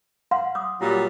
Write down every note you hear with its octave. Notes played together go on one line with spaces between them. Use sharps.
F5 F#5 C6
D6 D#6
A#2 F#3 G3